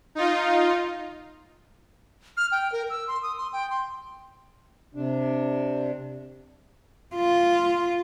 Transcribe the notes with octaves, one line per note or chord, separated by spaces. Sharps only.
D#4 F4
F6
G5
A#4
E6
C6
D#6
C6
G5
C6
C3 D4
F4